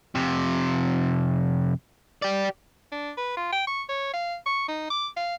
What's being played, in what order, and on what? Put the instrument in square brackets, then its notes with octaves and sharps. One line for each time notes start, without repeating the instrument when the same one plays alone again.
[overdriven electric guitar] F2 C3
G4 D5
[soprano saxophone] D4
B4
F4
G5
C#6
C#5
F5
C#6
D#4
D6
F5